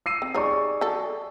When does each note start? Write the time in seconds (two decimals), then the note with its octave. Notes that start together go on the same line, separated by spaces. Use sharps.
0.06 E6 C7 D#7
0.22 C4
0.34 G3 D#4 G#4 C#5 D5 C#6
0.81 F#3 A4